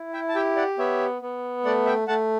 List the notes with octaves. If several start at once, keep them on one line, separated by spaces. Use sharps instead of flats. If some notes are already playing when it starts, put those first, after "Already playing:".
Already playing: E4
E5 G5
A5
G4 E5 G5
D5 F#5
B3 C#5 E5
B3
A3 D5 F#5
E5 G5
A3 F#5 A5